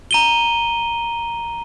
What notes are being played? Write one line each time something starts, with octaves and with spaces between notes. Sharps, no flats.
A#5 D#7 G7